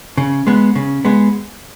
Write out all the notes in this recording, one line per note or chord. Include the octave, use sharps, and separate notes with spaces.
C#3
G#3 B3
C#3
G#3 B3